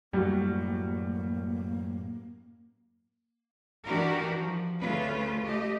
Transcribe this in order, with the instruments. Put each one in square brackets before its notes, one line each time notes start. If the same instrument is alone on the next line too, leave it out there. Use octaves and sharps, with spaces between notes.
[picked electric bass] F#2 A2 [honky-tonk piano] G3 F#4 [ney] A#3
[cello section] D#3 E3 D4 F#4 G4 A#4
F3
D2 C#3 A3 C#4 F4 B4
A3 G4 D#5